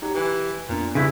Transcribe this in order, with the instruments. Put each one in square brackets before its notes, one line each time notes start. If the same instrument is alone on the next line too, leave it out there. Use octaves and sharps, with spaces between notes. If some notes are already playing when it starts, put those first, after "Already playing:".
[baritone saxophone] F#3 [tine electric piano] D#4 G4
[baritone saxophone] E3 [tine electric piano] G4 B4
[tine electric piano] F2 B3 D4 [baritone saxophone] A#2
[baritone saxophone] G2 [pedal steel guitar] C#3 E4